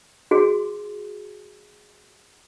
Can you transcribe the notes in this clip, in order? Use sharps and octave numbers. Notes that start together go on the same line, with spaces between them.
F#4 G#4 C6